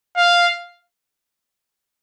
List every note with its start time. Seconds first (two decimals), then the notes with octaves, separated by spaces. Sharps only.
0.17 F5